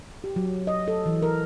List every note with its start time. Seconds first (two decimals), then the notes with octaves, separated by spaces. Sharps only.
0.24 G4
0.36 F#3
0.67 D#5
0.88 A4
1.06 E3
1.22 A#4